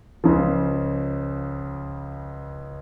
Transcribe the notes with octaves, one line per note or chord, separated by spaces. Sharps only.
C#2 C#3 F3